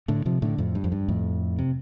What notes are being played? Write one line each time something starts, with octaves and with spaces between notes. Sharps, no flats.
A2 D3
C3 F3
A2 D3
F2 A2
G2
F2
G2
F2 A2
C3